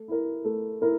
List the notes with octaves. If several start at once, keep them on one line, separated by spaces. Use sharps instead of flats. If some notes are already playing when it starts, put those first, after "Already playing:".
Already playing: A3
E4 A#4
A3
E4 A#4